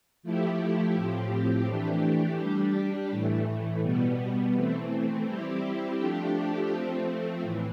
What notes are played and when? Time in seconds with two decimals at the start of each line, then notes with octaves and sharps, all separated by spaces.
0.23 F3 A3 E4 G4
0.95 A2 F3 C4 G4
1.67 E3 A3 D4 G4
2.39 G3 D4 G4
3.11 A2 E3 A3
3.82 B2 G3 B3
4.55 E3 A3 C4
5.26 G3 C4 E4 G4
5.98 F3 A3 D4 G4
6.69 F3 A3 C4
7.42 A2 E3